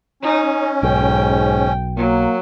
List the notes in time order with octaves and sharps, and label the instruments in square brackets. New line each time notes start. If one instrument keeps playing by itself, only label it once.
[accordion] C#4 [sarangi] D#4
[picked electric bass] B1 [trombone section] G#2 [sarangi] G5
[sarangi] F#3 [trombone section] A#3